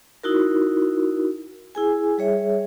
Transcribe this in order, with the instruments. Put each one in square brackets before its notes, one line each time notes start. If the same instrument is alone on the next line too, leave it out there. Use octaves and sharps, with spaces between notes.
[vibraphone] D#4 E4 F#4 A#4
E4 G#4 G#5
G3 G#4 C#5 E5